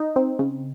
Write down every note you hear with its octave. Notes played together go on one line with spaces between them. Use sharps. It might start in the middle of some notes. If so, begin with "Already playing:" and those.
Already playing: D#4
C4
C#3